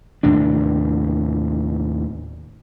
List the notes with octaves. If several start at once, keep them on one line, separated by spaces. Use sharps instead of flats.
D#2 A2 C3 D4